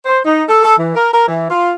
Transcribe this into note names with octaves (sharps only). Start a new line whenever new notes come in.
C5
D#4
A4
A4
E3
A#4
A#4
E3
F4